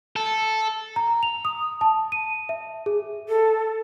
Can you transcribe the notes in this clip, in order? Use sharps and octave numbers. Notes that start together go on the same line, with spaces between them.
A4
A#5
F7
D#6
A5
D#7
E5
G#4
A4